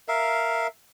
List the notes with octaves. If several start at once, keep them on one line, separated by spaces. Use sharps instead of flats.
A#4 E5 F5